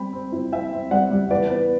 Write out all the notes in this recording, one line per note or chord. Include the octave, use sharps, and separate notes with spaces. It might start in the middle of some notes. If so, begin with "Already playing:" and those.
Already playing: G3 C4 G5 B5
C4
E4
C4 E5 G5
C4
G3 D5 F#5
G3
E3 B4 D5
B3